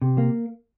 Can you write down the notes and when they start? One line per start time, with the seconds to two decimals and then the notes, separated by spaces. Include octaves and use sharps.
0.02 C3
0.18 A#3